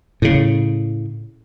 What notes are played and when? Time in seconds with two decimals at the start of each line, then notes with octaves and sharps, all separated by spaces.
0.22 A2 C#3